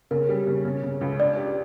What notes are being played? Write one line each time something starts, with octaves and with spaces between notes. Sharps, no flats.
C#3 A#4
G3
C#3
C#3
C#3
C#2
D4 D5
G4